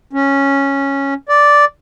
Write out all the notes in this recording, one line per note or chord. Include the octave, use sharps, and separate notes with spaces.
C#4
D5